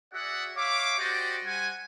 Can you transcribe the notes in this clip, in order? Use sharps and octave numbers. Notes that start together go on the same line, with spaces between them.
F#4 G#4 D5 E5 F#5
C#5 E5 F5 D6
F#4 G4 C5 D5 D#5 G5
G3 C5 F#5 G#5